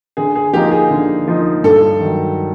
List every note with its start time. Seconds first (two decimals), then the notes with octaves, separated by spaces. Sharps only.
0.17 D3 G#4
0.36 G#4
0.53 F3 A#3 D#4 G4
0.72 G#4
0.91 D3
1.28 F3 A#3 D#4
1.64 G2 A4
2.00 D#3 F#3